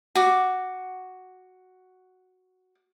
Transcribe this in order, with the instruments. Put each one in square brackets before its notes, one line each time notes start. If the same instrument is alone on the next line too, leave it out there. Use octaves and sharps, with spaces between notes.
[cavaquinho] F#4 D6